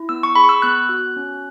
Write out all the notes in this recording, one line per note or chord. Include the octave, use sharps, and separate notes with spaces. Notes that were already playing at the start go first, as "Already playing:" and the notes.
Already playing: E4
B3 E6
C#6
G#4 B5
C#6
E6
B3 F#6
F#4
C#4